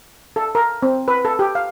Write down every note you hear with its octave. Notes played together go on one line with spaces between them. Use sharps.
A4
A#4
C4
B4
A4
G4
F5